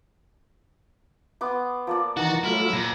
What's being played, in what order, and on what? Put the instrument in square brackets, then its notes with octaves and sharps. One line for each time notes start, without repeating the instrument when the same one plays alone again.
[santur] B3 C6 D6
F3 A#3 D5
[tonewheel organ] D#3 E3 A6 [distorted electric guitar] F#4 [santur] F#5 A#5
[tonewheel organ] F#3 A3 F4 [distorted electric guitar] E4
[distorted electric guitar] F2 [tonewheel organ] A#2 A#6